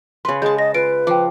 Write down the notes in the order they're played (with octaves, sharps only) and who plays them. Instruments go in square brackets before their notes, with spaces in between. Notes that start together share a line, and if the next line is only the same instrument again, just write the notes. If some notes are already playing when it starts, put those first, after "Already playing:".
[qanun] C#3 B4 [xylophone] C6
[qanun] G#3 A5 [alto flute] G#4 [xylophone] G6
[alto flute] D#5 [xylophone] A#6
[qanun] F4 [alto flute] B4 [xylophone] D7
[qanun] F3 [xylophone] G5 D6